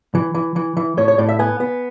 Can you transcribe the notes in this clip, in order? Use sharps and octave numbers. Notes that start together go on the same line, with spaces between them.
E3
E3
E3
E3
A2 C#5
C#5
A2 D5
E5
B3 G#5
B3